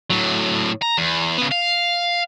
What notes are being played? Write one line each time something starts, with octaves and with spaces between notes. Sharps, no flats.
A2 F#3
A#5
E2
C#3 B3
F5